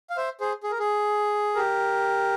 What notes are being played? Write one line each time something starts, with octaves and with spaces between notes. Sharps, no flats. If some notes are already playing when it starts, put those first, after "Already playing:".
F5
C5 E5
G#4 C5
G#4
A#4
G#4
G4 A#4